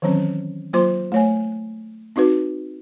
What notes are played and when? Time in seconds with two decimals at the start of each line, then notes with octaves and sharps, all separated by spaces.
0.02 D#3 E3 F#3 C4 C#4
0.73 F#3 A#3 F4 C5 C6 D6
1.12 A3 C#5 G#5
2.16 C4 D#4 F#4 B4